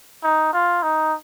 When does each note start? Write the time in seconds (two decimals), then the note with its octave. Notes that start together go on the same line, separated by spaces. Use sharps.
0.24 D#4
0.53 F4
0.83 D#4